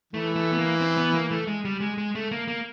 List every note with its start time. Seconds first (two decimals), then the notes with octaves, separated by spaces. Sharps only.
0.13 E3 A3
0.36 A3
0.53 B3
0.58 A#3
0.81 C4
0.97 B3
1.14 A#3
1.31 A3
1.47 G#3
1.65 G3
1.81 G#3
1.98 G#3
2.15 A3
2.31 A#3
2.48 A#3